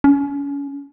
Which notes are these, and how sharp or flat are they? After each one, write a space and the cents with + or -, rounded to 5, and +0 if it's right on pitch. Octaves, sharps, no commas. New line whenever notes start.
C#4 +30